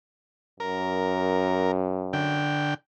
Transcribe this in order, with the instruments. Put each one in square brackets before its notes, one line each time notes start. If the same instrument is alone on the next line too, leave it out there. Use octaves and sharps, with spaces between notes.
[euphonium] F#2 [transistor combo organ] A#4
[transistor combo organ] D3 G5